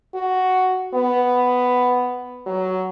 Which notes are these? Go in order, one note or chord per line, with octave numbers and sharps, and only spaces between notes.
F#4
B3
F#3